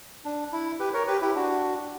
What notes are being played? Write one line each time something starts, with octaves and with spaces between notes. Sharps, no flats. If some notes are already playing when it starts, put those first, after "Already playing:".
D4
E4
G4 B4
A#4 C#5
G4 B4
E4 G4
D4 F#4